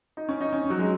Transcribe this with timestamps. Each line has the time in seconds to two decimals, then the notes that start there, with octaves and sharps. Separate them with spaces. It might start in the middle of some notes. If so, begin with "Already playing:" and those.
0.17 D#4
0.29 C#4
0.41 D#4
0.53 C#4
0.70 F#3
0.79 G#3